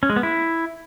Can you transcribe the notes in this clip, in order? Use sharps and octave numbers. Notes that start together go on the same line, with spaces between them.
C#4
G#3
B3
E4